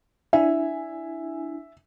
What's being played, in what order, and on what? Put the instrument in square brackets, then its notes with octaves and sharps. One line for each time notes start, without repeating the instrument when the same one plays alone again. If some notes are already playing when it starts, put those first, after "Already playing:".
[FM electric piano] D4 E4 G#5 [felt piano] E5